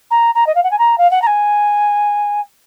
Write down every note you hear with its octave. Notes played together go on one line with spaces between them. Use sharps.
A#5
A#5
D#5
F5
F#5
G#5
A#5
F5
F#5
A#5
G#5